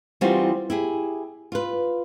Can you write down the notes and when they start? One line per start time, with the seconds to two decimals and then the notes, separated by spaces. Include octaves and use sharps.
0.21 E3 G3 C4 D#4 F4 F#4
0.70 E4 G4 G#4
1.52 F4 B4